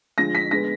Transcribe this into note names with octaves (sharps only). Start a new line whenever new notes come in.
D3 F3 G#3 A#6
B6
D3 G#3 B3 A#6